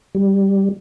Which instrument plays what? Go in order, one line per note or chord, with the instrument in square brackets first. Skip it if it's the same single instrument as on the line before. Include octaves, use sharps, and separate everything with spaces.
[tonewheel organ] G3